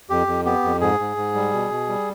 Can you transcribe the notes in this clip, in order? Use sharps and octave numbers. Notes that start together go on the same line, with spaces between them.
F2 G4
F2
B3 G4
F2
G#2 G#4
G#2
G#2
G3
B2
B2
G3